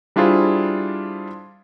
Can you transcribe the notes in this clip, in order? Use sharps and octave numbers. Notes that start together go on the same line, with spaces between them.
G3 D4 E4 F4 G#4 C5